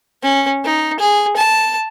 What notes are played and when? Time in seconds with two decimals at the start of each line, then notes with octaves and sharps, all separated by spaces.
0.23 C#4
0.64 D#4
1.00 G#4
1.37 A5